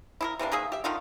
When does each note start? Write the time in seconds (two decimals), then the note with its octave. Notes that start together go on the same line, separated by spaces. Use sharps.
0.21 E4 G#4 A#4
0.39 C3 E3 A#3 D4
0.52 D#3 A#3 G#4 E5
0.72 G4 E5
0.84 D3 D#3 D#4 F4